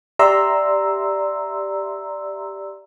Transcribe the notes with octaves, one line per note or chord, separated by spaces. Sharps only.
G4 D5 E5 A#5 C6 E6